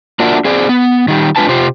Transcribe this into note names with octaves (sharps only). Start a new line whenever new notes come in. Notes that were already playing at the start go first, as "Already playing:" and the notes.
A#3 D4 F4 F#4 A#4 E5
C4 G#4 C5 D5
B3
D#3 G3
G#3 D4 F4 B4 G#5 A5
C3 F4 G4 C5